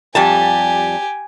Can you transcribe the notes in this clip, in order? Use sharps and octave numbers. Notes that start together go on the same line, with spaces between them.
F2 G3 G4 G#5 A5